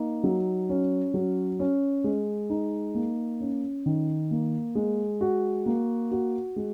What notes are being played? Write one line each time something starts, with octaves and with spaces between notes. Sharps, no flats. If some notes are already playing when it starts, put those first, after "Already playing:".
Already playing: A#3 D#4
F#3
C#4
F#3
C#4
G#3
D#4
A#3
C#4
D#3
A#3
G#3
F#4
A#3
F#4
G#3